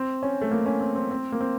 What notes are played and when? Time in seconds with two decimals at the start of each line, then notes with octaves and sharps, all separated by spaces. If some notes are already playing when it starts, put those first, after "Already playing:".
Already playing: C4
0.23 C#4
0.41 A3
0.51 A#3
0.66 C#4
0.81 C4
0.95 C4
1.11 C4
1.32 A#3
1.41 C4